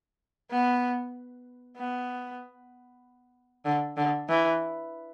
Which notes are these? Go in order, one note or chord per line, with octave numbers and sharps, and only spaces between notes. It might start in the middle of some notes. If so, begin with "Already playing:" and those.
B3
B3
D3
D3
E3